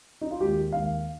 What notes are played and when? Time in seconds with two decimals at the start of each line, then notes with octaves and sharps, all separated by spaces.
0.21 D#4
0.31 F4
0.41 D#2 D#3 G#3 G4
0.72 D#2 D#3 G#3 F5